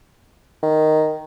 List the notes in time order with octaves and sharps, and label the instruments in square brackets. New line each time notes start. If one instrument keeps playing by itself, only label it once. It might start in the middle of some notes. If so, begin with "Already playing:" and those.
[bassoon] D#3